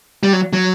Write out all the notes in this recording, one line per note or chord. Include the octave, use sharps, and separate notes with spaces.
G3
F#3
F#3